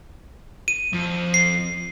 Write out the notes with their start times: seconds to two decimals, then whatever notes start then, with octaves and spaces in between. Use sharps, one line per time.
0.68 D#7
0.93 F2
1.34 C7